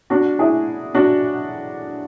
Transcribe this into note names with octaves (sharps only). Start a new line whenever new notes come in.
D4 F#4
E4 G#4
D4 F#4